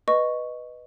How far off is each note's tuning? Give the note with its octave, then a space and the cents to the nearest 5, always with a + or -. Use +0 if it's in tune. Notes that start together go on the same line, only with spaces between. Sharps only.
B4 +0 D#5 -10 C#6 +0